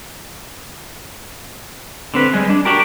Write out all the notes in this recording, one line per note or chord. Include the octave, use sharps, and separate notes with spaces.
D3 C4 B4
G3 G#3
D4
D4 F#4 G4 A#4